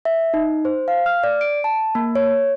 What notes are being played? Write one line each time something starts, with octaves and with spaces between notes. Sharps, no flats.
E5
D#4
C5
F5
F6
D5
D7
A5
A#3
C#5